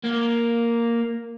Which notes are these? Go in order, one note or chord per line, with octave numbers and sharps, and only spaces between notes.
A#3